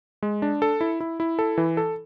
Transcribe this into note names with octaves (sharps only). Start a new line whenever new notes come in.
G#3
D4
A4
E4
E4
E4
A4
E3
A4